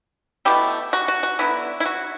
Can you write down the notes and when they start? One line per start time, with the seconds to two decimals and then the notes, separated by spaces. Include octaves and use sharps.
0.45 B2 A3 E4 G4
0.93 F#4
1.08 F#4
1.23 F#4
1.39 D3 F#3 B3 D4 E4
1.80 E4
1.86 F#4